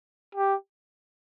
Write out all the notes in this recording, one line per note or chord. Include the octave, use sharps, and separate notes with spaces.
G4